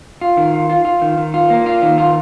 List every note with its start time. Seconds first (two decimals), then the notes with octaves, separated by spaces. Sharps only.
0.21 F4
0.37 D#3
0.54 F4
0.70 F4
0.85 F4
1.02 D#3
1.18 D#3
1.34 F4
1.50 A#3
1.66 F4
1.82 D#3
1.98 F4